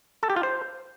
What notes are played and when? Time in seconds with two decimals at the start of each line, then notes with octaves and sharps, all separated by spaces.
0.23 A4
0.30 G4
0.36 F4
0.43 C5